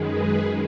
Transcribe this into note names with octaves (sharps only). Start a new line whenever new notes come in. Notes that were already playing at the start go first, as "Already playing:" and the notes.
Already playing: F#2 D#3 G#3 G#4 B4